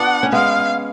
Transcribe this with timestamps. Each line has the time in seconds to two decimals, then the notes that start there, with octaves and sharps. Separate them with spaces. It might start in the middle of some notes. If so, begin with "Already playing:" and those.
Already playing: B3 D4 F4 F#5
0.23 C#4
0.32 G#3 B3 F5